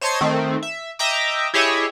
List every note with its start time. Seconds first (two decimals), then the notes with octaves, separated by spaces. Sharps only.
0.01 C5 C#5 D#5 A5 C6 G#6
0.21 D#3 A3 C4
0.63 E5
0.99 D#5 E5 G5 A#5 D6
1.54 E4 G4 G#4 C#5 D#5 E5